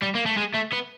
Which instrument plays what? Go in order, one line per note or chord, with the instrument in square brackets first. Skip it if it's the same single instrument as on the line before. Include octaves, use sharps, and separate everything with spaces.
[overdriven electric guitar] G3
A#3
A3
G#3
A3
B3